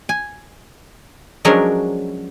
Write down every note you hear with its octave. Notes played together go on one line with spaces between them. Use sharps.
G#5
F3 F#3 G#3 C#4 D4 A#4